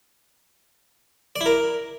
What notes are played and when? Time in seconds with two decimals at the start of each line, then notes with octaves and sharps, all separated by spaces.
1.36 D5
1.41 E4
1.46 A#4